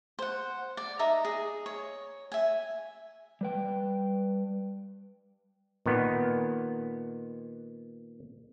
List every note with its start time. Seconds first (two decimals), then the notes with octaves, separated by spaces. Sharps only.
0.19 C5 F#5
0.77 D5
0.99 D#4 E5 A#5
1.25 G#4
1.66 C#5
2.32 E5 G#5
3.41 G3 B4 G5
5.86 A#2 D#3 B3